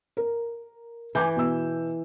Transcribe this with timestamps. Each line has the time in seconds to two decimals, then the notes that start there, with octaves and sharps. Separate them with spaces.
0.17 A#4
1.15 E3 G#5 D6 G6
1.36 B2 E6